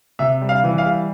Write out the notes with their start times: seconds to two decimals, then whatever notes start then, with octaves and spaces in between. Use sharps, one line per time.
0.19 C3 E5
0.41 G3
0.49 F5
0.64 E3
0.78 F5
0.86 G3